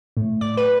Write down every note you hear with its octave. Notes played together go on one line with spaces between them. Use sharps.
A2
A2 D5
B4